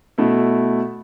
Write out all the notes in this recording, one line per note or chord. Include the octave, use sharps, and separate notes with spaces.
B2 A3 E4